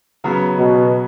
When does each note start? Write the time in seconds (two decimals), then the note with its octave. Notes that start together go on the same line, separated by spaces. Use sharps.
0.24 C#3 F#3 B3
0.57 B2